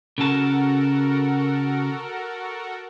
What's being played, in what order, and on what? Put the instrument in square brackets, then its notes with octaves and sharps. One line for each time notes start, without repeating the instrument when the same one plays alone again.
[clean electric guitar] C#3 A5 [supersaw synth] F#4 A4 A#4